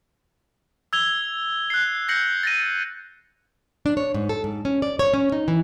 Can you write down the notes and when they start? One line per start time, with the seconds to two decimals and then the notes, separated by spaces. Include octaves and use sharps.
0.93 E6 G#6 F7 G7
1.70 F#6 C7
2.08 G6 A#6 C7 C#7 F#7
2.43 A6 A#6 D#7
3.86 D4
3.97 C#5
4.14 G#2
4.29 A4
4.44 G#2
4.65 C#4
4.82 D5
4.99 C#5
5.14 C#4
5.32 D#4
5.48 E3